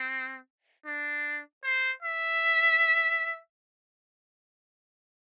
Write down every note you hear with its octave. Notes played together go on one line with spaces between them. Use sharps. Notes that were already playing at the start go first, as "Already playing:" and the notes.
Already playing: C4
D4
C5
E5